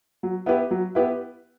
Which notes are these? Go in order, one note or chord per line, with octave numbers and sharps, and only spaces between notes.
F#3
B3 E4 G4 B4
F#3
B3 E4 G4 B4